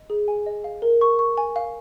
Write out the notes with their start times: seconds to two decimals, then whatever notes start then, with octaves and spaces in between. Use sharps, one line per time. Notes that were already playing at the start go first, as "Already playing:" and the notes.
Already playing: D#5
0.10 G#4
0.28 G#5
0.46 D#5
0.64 F5
0.82 A#4
1.01 C#6
1.19 C#6
1.38 G#5
1.56 F5